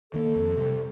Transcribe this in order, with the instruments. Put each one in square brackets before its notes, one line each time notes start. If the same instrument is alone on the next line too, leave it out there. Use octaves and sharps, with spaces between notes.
[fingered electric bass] D#3 A#3 [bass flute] A4
[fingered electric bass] F2
C3 G3